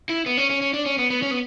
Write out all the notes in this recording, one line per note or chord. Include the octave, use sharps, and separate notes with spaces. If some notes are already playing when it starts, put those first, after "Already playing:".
E4
B3
C#4
C#4
C#4
D4
C#4
B3
B3
C#4
B3